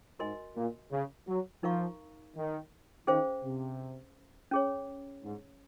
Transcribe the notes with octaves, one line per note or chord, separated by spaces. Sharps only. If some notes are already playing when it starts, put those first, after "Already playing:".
G#2 F#4 A#4 D#5 G#5 C6
A#2
C#3
F#3
F3 D#4 A#4 F5 A#5 C#6
D#3
D#3 C#4 G#4 C5 F5
C3
C#4 G#4 C#5
G#2